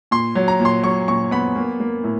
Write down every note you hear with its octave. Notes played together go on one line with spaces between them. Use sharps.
A#2 C6
F#3
A#5
A#2
C6
F#3 C#6
A#2 C#6
B3 B5
A#3
A#3
A2